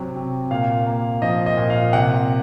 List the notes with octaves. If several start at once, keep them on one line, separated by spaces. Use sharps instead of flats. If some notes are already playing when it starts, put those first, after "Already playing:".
Already playing: C3 F#3 C4
C3
A#2 F5
A#3
F3 D#5
D#5
A#2
F5
C3 F#5